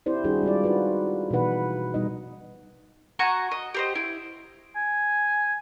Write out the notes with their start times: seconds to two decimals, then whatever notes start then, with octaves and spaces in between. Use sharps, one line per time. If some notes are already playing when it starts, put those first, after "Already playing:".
0.06 C4 E4 G4 C5 D5
0.24 D#3 G3 D4 E4 F#4 G#4
0.43 G3 G#3 F4 D5
0.64 D#4 F4 F#4 B4
1.31 B2 E3 F3 D#4 B4 F#5
1.94 B2 G3 B3 D#4 D#5
3.19 F#4 G#5 A#5 C#6
3.52 D#5
3.74 G4 C5 D#5
3.95 E4
4.75 G#5